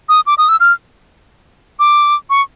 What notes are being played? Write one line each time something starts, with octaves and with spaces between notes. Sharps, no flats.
D#6
D6
D#6
E6
F6
D6
C#6